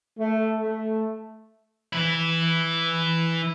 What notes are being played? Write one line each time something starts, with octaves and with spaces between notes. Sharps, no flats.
A3
A3
E3 E4